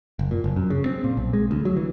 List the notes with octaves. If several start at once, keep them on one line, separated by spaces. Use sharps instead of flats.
F#1
A#2
F#1
F#2
C#3
C4
A#2
B1
G#3
D2
F#3
E3